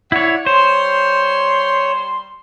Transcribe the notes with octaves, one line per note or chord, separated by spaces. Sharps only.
E4 C#5 D5 F#5
G3 C5 C#5 C6